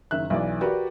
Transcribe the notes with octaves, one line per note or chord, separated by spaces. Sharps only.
F#1 D#3 E5 F#6
B1 E3 D5
F#4 G4 A#4 B4 D5